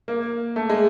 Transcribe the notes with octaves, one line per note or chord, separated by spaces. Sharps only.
A#3
A3
G#3